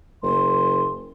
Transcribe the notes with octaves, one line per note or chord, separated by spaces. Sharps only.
F#1 C6